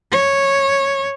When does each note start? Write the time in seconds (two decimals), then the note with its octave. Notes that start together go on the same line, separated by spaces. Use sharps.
0.12 C#5